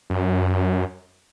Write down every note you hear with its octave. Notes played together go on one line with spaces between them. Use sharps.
F#2